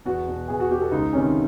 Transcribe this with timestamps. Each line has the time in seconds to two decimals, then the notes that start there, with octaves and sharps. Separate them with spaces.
0.05 E2 F#4
0.28 B2
0.48 E2 G#4
0.60 F#4
0.70 B2 G4
0.81 A4
0.91 C#2 D#4
1.13 C3 D#3 C#4